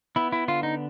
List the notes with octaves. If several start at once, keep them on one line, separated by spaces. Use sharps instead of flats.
B3 E4
E4
D3 F4
D#4